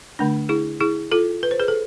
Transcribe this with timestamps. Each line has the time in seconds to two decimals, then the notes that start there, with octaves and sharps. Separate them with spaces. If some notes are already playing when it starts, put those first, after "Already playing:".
0.19 D3 A3 D4
0.49 E4 G#4
0.81 E4 G#4
1.12 F4 A4
1.43 B4
1.51 C5
1.60 G#4 B4
1.68 A4